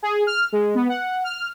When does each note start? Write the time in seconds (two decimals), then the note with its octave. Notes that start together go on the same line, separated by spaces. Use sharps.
0.03 G#4
0.27 F6
0.52 G#3
0.75 B3
0.89 F#5
1.24 F6